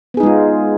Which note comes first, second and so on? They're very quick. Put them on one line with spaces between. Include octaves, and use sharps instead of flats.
B3 G#4 D#4 G#3 F4